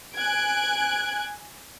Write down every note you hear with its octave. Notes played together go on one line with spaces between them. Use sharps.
G#5 F#6 G#6 D7